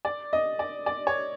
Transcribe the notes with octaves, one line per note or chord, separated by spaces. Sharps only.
D5
D#5
D5
D5
C#5